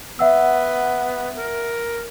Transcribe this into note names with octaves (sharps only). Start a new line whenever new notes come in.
B3 E5 F#5 E6
A#4